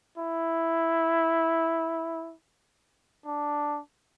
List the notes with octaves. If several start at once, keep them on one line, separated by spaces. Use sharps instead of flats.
E4
D4